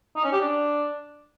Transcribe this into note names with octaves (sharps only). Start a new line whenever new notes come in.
D#4
C#4
G4
D4